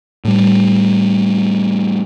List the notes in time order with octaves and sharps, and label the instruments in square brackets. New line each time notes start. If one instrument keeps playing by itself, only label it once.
[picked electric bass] A2 G3